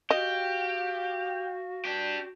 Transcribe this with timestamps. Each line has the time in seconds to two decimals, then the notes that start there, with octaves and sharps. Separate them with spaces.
0.11 F#4 G4 D#5 F5
1.85 D4 G4